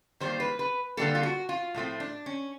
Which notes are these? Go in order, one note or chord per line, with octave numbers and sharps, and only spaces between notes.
D#3 G3 A#3 C5
B4
B4
D3 G3 A#3 A4
F4
F#4
F4
A2 F3 A3 C4
D4
C#4